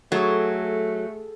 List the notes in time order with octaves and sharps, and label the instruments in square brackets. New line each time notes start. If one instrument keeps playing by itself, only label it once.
[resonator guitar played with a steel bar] F#3 [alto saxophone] A3 [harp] G#4 A4